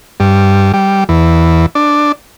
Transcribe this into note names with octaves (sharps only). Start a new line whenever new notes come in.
G2
G3
E2
D4